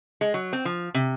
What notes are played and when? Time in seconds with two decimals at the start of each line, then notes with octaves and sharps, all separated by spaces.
0.21 G#3
0.34 F#3
0.53 C4
0.65 F3
0.94 C3